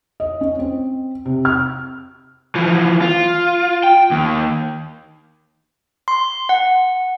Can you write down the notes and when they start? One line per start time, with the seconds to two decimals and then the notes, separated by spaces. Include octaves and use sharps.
0.20 D#5
0.41 C#4
0.59 C4
1.26 C3
1.45 F6
2.56 E3 F3
3.02 F4
3.84 G5
4.11 D#2
6.08 C6
6.49 F#5